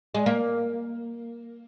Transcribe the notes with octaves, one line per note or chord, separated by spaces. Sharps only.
G#3
A#3